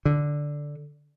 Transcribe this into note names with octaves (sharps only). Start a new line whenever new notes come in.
D3